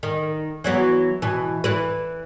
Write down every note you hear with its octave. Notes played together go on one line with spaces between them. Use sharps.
D#3
E3 F#3 B3
B2 E3
E3 E4 B4